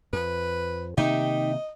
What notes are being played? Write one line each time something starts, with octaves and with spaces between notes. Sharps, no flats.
F2 B4
C3 D#3 A#3 D#4 G4 D#5 E5